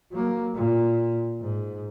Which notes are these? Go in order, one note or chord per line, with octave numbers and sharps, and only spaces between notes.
F#3 A#3
A#2
G#2